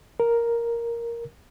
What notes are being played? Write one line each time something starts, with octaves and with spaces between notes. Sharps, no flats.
A#4